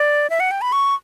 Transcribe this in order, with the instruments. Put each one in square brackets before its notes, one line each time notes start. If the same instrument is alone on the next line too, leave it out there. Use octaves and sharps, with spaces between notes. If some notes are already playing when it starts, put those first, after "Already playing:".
Already playing: [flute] D5
E5
F#5
G5
B5
C#6